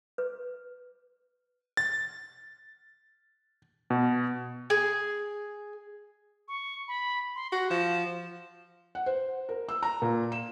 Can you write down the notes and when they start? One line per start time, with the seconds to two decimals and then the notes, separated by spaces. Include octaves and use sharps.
0.18 B4
1.77 A6
3.90 B2
4.70 G#4
6.48 C#6
6.88 B5
7.36 C6
7.52 F#4 A#6
7.70 F3 E7
8.95 F#5
9.06 C5
9.49 A#4
9.69 E6
9.83 A#5
10.02 A#2
10.32 E7